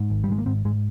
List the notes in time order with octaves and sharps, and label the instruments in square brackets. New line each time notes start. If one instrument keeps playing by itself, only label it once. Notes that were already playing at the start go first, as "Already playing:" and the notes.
Already playing: [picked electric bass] G#2
G#1
G3
G#1 G#3
A#3
G#2 C4
G#2 G#3